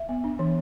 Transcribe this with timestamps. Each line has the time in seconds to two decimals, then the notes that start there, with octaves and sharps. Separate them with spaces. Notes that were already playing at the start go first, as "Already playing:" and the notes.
Already playing: E5
0.09 B3
0.24 D4
0.39 E3